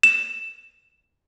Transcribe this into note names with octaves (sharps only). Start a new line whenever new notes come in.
E7